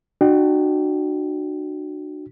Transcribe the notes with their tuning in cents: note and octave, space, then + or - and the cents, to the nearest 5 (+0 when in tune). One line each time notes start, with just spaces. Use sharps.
D4 +40 F#4 +0 G5 +0